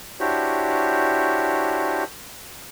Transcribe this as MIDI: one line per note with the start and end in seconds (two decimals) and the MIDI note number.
0.20 2.04 62
0.20 2.04 64
0.20 2.04 66
0.20 2.04 67
0.20 2.04 72
0.20 2.04 73